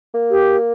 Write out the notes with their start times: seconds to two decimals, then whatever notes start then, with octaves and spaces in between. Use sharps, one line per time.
0.14 A#3
0.31 G4